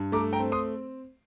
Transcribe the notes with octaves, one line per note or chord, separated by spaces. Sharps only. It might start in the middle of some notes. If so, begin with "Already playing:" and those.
Already playing: G2
A3 A#5 D6
G5 A#5
C4
C6 D#6